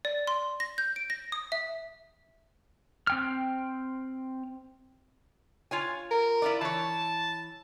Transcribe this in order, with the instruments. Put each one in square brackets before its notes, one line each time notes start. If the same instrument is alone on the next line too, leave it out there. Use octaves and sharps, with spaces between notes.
[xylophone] D5
C6
A#6
G6
D7
A#6
D#6
E5
[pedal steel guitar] C4 G5 F6
[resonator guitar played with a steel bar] F4 C#5 G#5
[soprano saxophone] A#4
[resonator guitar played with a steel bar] E4 F4 D5
[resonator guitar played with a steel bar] E3 C#5 [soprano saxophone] A5